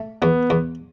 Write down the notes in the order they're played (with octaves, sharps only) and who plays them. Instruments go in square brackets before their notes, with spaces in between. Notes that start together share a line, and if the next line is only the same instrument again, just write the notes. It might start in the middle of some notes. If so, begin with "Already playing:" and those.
Already playing: [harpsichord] A3
[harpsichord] E2 [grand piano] B3
[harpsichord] E2